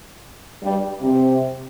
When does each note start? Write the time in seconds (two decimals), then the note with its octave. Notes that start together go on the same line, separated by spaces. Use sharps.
0.63 G2 G3
1.01 C3